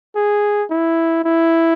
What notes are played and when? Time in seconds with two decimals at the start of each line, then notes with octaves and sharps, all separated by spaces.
0.15 G#4
0.70 E4
1.24 E4